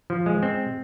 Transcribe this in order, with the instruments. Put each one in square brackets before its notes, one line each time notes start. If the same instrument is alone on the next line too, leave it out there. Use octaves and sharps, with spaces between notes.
[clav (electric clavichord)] F3
G#3
C4